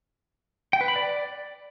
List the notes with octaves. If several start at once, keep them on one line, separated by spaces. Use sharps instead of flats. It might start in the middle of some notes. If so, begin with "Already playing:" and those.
G5
B4
B5
D5